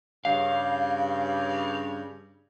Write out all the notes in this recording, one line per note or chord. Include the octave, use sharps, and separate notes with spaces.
G2 C#3 F5